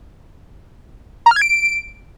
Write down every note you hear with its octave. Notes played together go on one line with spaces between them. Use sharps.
A#5
F6
G#6
D7